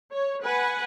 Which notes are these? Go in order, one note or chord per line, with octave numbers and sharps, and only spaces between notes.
C#5
B4 F#5 G#5